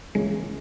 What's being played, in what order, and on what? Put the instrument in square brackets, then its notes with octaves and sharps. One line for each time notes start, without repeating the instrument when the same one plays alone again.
[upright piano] C#2 C#3 E3 A#3 C#4 [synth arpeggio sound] G#3